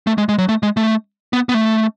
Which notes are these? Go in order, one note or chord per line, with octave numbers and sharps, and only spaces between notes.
A3
G#3
G#3
F#3
A3
G#3
A3
B3
B3
A3